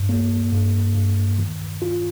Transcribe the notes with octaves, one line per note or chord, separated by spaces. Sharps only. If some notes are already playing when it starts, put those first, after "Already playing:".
Already playing: G2
A#3
G2
G2
D#3
F4